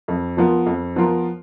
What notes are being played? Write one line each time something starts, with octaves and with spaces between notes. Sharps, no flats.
F2
F3 B3 F4 A#4
F2
F3 B3 F4 A#4